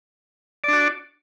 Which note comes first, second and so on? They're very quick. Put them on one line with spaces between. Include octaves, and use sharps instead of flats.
D5 D4 F#4